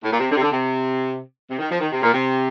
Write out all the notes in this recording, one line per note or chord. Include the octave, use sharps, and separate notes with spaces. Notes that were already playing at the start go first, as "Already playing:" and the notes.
A2
A#2
C3
D3
C3
D3
C3
C3
D#3
F3
D#3
C3
A#2
C3